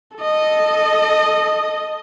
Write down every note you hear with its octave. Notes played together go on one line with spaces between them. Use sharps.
A4 D#5